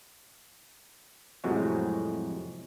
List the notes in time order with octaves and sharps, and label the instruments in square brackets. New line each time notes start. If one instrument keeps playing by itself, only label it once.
[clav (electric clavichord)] F2 A2 C3 F#3 G#3 F#4